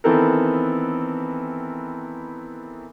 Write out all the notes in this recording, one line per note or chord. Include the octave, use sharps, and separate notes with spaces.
D#3 E3 B3 C4 A4 A#4